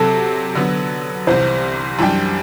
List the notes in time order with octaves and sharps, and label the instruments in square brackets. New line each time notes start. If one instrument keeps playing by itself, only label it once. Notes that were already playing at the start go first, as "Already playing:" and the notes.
Already playing: [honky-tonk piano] C3 F#3 C4 [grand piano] A4
[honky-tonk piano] D3 F#3 B3
[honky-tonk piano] C2 C3 E3 [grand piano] C5
[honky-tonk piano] F#2 E3 G3 D4 G4